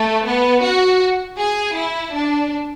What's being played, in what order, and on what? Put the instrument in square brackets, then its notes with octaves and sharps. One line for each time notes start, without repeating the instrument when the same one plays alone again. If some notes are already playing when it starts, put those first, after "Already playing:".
Already playing: [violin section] A3
B3
F#4
G#4
E4
D4